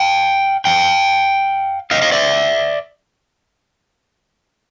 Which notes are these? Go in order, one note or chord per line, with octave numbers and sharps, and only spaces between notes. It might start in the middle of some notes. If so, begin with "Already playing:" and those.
Already playing: F5 G5
F5 G5
D#5 F5
D#5 F5
D5 E5